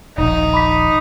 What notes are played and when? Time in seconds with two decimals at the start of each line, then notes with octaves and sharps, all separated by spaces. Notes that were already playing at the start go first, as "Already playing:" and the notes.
0.18 D#1 A#1 D#4
0.54 B5 D6 B6